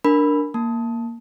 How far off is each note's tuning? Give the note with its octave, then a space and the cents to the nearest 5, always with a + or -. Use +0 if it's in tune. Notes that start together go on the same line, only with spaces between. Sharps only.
D4 +0 A#4 +0 B5 +0
A#3 +0 A5 +0